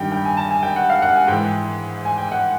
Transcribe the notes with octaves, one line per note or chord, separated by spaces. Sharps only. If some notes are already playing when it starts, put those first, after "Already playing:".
Already playing: G2 D#3 G5
G5
G#5
A5
G#5
G5
F#5
F5
F#5
G#5
G#2 E3 G5
G#5
G5
F#5